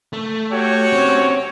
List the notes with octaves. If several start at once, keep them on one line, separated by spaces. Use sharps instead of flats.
A3
F#4 G4 C#5
C4 C#4